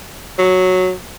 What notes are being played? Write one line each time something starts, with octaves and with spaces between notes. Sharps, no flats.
F#3